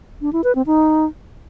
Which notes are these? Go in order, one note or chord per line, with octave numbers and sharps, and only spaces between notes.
D4
E4
B4
C4
D#4